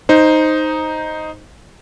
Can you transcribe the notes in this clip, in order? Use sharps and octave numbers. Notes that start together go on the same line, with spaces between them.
D#4 C5